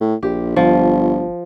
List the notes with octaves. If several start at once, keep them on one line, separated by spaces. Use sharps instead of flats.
A2
A#1 G4
G1 F3